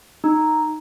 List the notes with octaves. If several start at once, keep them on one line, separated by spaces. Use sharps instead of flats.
D#4